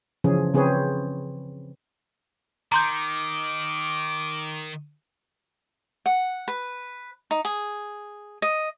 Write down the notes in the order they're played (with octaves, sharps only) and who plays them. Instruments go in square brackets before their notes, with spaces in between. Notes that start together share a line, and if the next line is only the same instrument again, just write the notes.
[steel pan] C#3 E3 F3 C#4 G#4
C#3 C4 G#4 B4 C#5
[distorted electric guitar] D#3 [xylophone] A#5 C6 G6 [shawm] D6
[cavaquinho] F#5
B4
D#4
G#4
D#5